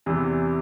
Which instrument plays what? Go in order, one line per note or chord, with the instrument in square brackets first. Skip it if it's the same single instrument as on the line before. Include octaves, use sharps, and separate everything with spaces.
[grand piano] E2 C3 E3